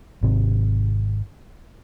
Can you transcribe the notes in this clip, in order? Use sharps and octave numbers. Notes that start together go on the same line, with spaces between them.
G#1 C3